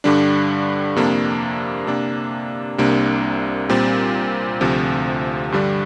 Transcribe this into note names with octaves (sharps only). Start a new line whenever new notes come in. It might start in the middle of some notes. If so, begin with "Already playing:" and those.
G2 D3 G3 D4
F2 C3 A#3 D4
C3 A#3 D4
C2 C3 A#3 D4
A#2 G3 C4
D2 C3 F3
G2 D3 G3 D4